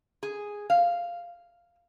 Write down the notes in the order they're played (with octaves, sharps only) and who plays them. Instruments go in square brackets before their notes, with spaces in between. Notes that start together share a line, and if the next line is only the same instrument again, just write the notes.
[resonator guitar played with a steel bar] G#4
F5